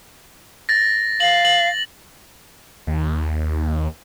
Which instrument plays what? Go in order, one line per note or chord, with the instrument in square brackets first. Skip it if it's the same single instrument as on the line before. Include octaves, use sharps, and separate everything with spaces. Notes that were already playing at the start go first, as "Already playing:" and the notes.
[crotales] A6 A#6
[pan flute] F5 [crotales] F#7
[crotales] F#7
[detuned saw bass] D#2